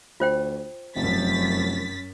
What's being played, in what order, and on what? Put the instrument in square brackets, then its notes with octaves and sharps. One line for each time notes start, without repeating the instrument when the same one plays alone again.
[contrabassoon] D2 [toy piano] F4 C5 G5
[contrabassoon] F1 [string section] F#2 A6 B6